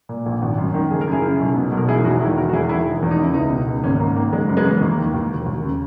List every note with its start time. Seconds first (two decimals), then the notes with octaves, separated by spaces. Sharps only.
0.09 A#2
0.26 A#1
0.42 G#1
0.58 F#2
0.74 D#3
0.91 F#1 G#4
1.01 A#4
1.07 F#2 E4 G#4
1.24 C#3
1.40 B1
1.56 B2
1.72 B1
1.77 A#4
1.88 E1 E4 G#4
2.04 E2 D#4 F#4
2.21 D#3 E4 G#4
2.37 E1 F#4 A#4
2.49 F#4
2.53 E2 E4 G#4
2.69 D#3 E4 G#4
2.86 E1
3.02 E2
3.11 D#4
3.19 C#3 E4
3.34 C#2 B3 D#4
3.51 B2
3.67 C#2
3.83 G#1 A#3 C#4
4.00 G#2 A#3
4.16 D#3 A#3
4.33 F#1 G#3
4.49 F#2
4.57 G#3 B3
4.65 E3
4.81 D#2 A#3
4.98 D#3
5.14 D#2
5.30 E1
5.46 D#2
5.63 C#3